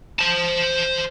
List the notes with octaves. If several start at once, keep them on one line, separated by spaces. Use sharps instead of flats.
C5 A5